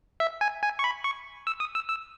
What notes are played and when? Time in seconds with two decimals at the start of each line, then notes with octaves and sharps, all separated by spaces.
0.20 E5
0.41 G#5
0.63 G#5
0.79 C#6
0.84 B5
1.04 C#6
1.47 E6
1.60 D#6
1.75 E6
1.88 E6